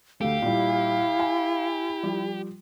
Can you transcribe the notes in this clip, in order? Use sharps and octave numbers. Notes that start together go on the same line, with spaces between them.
D2 A3 G4 F5
A#2 G3 E4
G#5
F3 G3